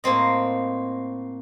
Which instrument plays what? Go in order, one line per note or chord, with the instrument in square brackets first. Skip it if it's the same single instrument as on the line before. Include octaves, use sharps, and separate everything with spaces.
[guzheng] A2 A#3 C4 D#5